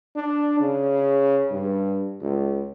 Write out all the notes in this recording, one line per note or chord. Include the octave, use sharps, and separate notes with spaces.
D4
C#3
G2
C#2